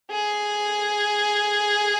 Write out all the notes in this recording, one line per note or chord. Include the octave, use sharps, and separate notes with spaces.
G#4